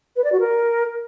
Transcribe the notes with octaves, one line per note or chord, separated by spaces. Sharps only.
B4
D5
F#4
A#4